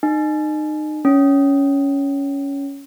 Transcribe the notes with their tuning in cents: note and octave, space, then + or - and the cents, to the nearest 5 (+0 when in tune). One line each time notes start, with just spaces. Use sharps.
D#4 -30
C#4 +10